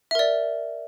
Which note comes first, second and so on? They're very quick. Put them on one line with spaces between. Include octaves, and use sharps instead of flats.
E5 A#4 D5